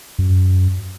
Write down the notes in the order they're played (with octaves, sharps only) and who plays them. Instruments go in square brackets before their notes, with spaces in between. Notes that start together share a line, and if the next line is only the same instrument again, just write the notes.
[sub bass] F#2